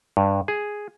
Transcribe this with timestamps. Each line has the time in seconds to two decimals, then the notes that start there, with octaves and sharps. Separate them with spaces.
0.17 G2
0.48 G#4